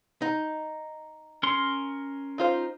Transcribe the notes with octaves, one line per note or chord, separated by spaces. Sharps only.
D#4
C#4 A#4 C6
D#4 F4 C5